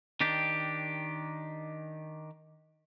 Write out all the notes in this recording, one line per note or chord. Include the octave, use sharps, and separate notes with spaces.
D#3 D4 G4